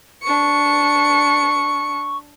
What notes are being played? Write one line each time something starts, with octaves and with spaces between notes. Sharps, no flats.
D4 C#6 C#7